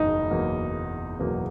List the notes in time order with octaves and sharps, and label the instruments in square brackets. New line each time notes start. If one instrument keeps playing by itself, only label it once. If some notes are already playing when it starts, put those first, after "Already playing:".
Already playing: [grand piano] F#1 E2 B2 F#3 A#3 [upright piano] D#4
[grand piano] F#1 E2 B2 F#3 A#3
F#1 E2 B2 F#3 A#3